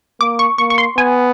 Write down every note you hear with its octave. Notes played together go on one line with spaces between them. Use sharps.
A#3 D6
C#6
A#3 C#6
C#6
C6
B3 G#5